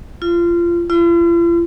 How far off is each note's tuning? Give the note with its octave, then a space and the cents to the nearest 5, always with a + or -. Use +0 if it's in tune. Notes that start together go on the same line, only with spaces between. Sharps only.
F4 -25
F4 -45